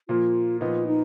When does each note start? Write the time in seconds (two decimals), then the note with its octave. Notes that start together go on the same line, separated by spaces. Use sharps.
0.09 A#2 F3 A#3 F4
0.61 A#2 F3 B3 D#4 F4
0.87 D#4